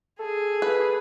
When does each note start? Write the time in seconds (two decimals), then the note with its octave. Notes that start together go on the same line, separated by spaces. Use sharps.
0.19 G#4 A4
0.62 B4